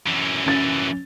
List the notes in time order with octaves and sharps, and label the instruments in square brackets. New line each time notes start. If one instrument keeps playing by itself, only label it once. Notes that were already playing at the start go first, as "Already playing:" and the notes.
[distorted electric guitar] F#2 E3
[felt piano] C#4 A6